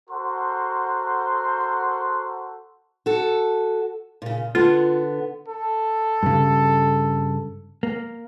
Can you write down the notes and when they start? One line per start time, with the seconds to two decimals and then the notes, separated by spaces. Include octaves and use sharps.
0.10 F#4 A4 A#4 C5 F#5 C6
3.06 F#4 A4
4.22 A#2 C#3
4.55 D3 B3 F4
5.49 A4
6.23 G2 C#3
7.83 A#3